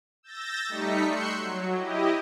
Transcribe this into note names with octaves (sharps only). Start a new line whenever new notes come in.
E6 G6 A6 A#6
G3 A3 D#4 B6 C#7
C6 C#6 E6 F#6 G6 C#7
F#3
E4 G4 D#5